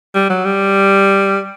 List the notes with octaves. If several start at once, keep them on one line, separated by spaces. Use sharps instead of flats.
G3
F#3
G3